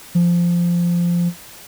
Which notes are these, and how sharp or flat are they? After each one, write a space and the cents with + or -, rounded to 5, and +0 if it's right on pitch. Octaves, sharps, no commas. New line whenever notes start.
F3 -10